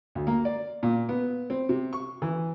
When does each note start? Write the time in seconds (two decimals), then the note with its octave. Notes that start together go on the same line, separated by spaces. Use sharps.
0.15 D2
0.27 A#3
0.45 D5
0.83 A#2
1.09 B3
1.50 C4
1.69 C3
1.93 C#6
2.22 E3